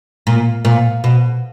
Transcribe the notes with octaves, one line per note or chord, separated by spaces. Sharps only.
A#2
A#2
B2